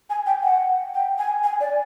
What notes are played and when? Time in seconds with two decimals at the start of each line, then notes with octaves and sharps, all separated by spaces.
0.10 G#5
0.26 G5
0.43 F#5
0.94 G5
1.18 G#5
1.44 G#5
1.60 D5